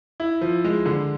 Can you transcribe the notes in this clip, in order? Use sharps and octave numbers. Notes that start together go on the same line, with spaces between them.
E4
F3
G#3
D3